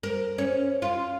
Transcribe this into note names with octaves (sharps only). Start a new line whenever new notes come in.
A#4
C#4
F4